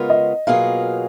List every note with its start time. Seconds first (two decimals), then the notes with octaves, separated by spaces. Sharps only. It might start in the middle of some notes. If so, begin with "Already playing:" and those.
Already playing: C#3 G#3 B3 F4 A#4
0.10 D#5
0.47 B2 F#3 A#3 F4 G#4 F5